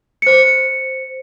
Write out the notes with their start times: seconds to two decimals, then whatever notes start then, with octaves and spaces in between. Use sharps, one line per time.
0.22 C5 C#7